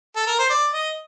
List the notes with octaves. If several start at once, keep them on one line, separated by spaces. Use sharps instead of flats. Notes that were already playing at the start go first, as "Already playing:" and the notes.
A4
A#4
C5
D5
D#5